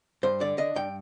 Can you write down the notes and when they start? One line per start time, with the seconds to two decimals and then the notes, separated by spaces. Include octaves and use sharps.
0.23 G2 C5
0.40 D3 D5
0.58 D4 D#5
0.76 G2 G5